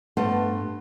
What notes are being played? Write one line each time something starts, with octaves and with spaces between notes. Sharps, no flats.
G2 A3 B3 C5 F#5